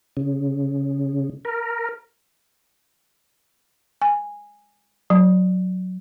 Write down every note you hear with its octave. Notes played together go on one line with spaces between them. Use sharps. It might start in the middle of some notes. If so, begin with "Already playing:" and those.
C#3
A#4
G#5
F#3